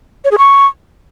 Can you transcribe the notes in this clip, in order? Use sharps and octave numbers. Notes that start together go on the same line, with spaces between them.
C#5
G#4
C#6